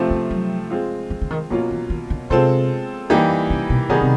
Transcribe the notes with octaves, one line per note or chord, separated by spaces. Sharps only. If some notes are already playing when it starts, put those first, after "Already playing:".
Already playing: C3 F3 A3 C4 F4
B3
F#3
G#3 C4 F4
E3
D3
D#3
B2 F3 F#3 A#3 C#4 F4
E3
D#3
D3
C3 G#3 C4 F4 A4 C5
E3 G3 A#3 D#4 G4
C#3
B2
C3 D#3 G3 B3 D#4 G#4
C3